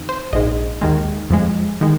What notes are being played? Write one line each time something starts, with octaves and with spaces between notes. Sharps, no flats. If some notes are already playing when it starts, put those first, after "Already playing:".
Already playing: F2 D#3
C5
A#1 G#2 G#3 D#5
D#2 D#3 G#3
F2 F3 G#3
D#3 G#3